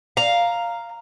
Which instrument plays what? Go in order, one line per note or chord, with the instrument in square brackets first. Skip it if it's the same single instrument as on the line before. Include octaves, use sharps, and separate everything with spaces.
[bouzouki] F5 A#5